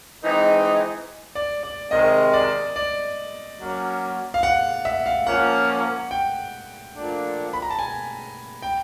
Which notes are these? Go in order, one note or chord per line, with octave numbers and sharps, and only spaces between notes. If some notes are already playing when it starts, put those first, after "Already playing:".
E3 G#3 C4 D#4
D5
D5
C3 D#3 G#3 D#5
D5
D5
F#3 A#3 C#4
F5
F#5
E5
F5
F3 A#3 C#4 F#5
G5
A#2 F3 A3 D4
B5
A#5
A5
G#5
G5